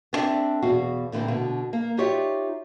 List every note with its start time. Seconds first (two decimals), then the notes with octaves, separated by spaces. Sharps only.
0.13 B3 C4 D4 A4 D5 E5
0.62 E2 B2 F#4 F5
1.12 A#2 D3 E3 G3 A#3 C4
1.28 B2 D3
1.73 A#3
1.97 D#4 F4 G4 C#5 D5 E5